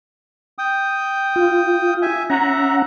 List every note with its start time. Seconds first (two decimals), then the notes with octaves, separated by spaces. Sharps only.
0.58 G5 D#6
1.36 F4
2.02 E5 G#5
2.30 C#4 E5 F#5 A#5